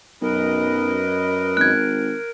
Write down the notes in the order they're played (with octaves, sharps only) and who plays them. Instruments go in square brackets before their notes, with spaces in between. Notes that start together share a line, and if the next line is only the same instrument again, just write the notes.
[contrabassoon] B1 [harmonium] F#2 B4 D#5 [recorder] A#4
[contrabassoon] G#1 [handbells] F#6 G#6